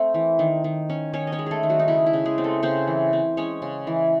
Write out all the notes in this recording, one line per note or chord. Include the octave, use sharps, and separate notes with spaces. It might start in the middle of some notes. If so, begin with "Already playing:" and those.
Already playing: A3 C4 A4
E3
D#3
D#3
C#4
D#3 C#4 C#5
D#5
C#4 C#5
G#3
A3 G#4 A4
D#3
F#3 F#4
D#4
C#3 E4
E4
C#3
G#3 G#4
C4
A3 A4
C#3 C4 C5
E3
C4
G#3 C#4 C#5
C#3
E3